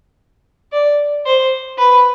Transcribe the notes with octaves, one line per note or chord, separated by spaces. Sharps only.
D5
C5
B4